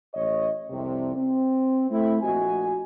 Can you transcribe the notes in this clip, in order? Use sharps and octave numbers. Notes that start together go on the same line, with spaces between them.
A1 C#5 D#5
C2 F2 C3
C4
A3 C4 E4
A#1 F#4 D#5 G#5